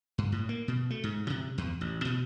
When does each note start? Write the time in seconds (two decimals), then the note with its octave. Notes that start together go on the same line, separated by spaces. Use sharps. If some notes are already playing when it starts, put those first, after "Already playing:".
0.18 G2
0.32 A2
0.49 A#3
0.68 B2
0.90 A3
1.04 G#2
1.30 C3
1.58 E2
1.81 A1
2.05 B2